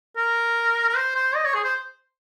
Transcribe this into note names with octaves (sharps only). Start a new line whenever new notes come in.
A#4
A#4
C5
C5
D#5
C#5
G#4
C5